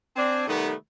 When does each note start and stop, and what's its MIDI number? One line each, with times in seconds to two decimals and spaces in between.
0.16 0.45 60
0.16 0.45 62
0.16 0.45 80
0.47 0.72 48
0.47 0.72 51
0.47 0.72 55
0.47 0.72 57
0.47 0.72 59